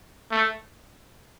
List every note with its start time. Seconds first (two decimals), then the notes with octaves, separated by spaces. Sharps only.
0.31 A3